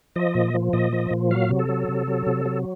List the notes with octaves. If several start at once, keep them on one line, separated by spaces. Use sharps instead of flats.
F3 D#5
A#2
F3
A#2 D#5
F3
A#2
F#3 F5
C3
A4
F#3
C3
F#3
C3
F#3